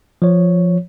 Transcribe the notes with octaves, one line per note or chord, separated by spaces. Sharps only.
F3 C#5